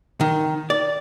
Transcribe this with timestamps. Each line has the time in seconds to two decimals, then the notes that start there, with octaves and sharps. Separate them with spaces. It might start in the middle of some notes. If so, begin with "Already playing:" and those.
0.21 D#3
0.70 D5